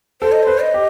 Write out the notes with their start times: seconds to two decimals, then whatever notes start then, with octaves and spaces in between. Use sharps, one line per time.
0.21 A4 C5
0.32 D#5
0.43 B4 C5
0.61 D#5
0.74 G4